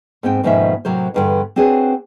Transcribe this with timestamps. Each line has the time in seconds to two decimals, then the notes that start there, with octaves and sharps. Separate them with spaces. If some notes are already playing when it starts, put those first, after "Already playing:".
0.23 G#2 B3 C4 G5
0.44 D#2 G#2 B2 F3 C#4 E5
0.85 A2 C3 F#3 A#4 C5
1.14 E2 G2 D3
1.56 C4 D4 F#4 G#4 B4 C#5